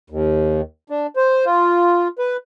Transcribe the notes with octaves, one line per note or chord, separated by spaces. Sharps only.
D#2
D4
C5
F4
B4